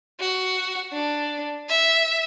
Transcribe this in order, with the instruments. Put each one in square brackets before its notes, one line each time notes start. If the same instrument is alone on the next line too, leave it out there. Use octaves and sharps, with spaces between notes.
[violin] F#4
D4
E5